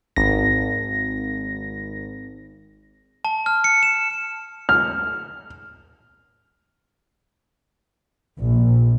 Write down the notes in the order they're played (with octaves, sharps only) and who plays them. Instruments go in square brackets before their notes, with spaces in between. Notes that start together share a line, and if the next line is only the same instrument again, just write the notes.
[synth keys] G#1 A#6
[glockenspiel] A5
F6
C#7
E7
[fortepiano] F6
[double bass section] A#1